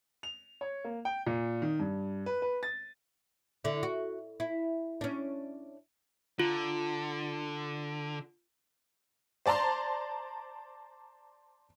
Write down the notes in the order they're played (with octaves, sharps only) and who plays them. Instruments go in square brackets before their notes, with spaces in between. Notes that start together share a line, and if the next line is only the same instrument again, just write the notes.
[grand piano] F7
C#5
A#3
G5
A#2
D#3
G2
B4
B4
A6
[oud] D3 E4
F#4
E4
C#4 D4
[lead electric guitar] D3 [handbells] F4
[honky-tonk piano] C5 D5 A5 A#5 C6